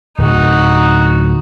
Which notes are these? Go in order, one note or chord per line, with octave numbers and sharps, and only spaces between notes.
D1 D#4 F#4